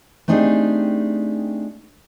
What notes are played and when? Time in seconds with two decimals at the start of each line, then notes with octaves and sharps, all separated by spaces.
0.28 A3 C4 D4 D#4 G4 G#4